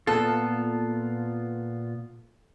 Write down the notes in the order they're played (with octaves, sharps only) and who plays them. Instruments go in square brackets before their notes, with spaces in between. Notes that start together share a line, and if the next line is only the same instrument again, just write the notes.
[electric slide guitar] A#2 B3 F4 [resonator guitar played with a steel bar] A4